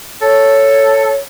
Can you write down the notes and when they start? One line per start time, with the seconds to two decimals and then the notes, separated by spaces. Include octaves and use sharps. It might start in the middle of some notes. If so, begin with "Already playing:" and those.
0.22 A4 C#5